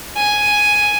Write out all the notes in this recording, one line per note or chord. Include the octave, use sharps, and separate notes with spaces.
G#5